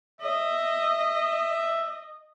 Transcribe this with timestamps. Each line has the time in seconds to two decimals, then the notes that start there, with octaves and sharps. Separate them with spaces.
0.21 D#5 E5
0.86 E5